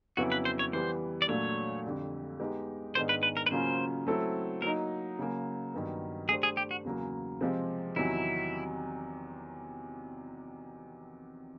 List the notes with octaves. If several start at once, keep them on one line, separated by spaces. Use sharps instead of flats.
F2 C#3 F#3 B3 E4 F#4
B4
C5
C#5
E3 G3 B3 C5
D5
A#2 F#3 A3 D4 C#5
F2 D3 G3
G#3 B3 D#4 G4
G#2 D#3 G#3 B3 D4 C5
B4
B4
A#4
B4
C#3 F#3 A#3 C#4 F4 C5
F#3 A3 C4 E4 A4
F#3 A#3 D#4 A#4
C#3 F#3 A#3
G2 D#3 F#3 B3
A3 D4 G4 G#4 C5
G#4
G4
F#4
E2 C#3 F#3 A#3
C3 F3 G#3 C4
E2 C3 D#3 F#3 E4